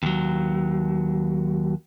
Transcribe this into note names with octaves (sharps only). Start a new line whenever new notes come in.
D#2 F#3